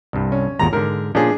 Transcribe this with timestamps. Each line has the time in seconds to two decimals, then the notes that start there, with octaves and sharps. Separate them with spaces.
0.13 C2 G2
0.32 C#4
0.59 G#1 E2 A#2 A#5
0.73 G#2 D3 A#4
1.15 A#2 F3 C#4 D4 G#4